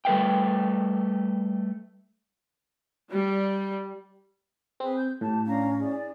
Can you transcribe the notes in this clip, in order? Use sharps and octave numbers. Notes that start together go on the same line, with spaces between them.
G3 A3 B4 F5 G5
G3
C4 G#4 B4
G6
A2 G4 A5
C#4 D4 F5 A#5
E4 G#4 D5